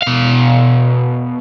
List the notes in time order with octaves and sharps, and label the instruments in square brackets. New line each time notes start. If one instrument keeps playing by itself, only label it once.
[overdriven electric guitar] B2 F5